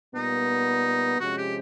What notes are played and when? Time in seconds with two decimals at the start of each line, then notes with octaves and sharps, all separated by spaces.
0.15 A#2 G3 B3 D#4
1.20 C3 F3 G#3 C#4 F#4
1.38 G4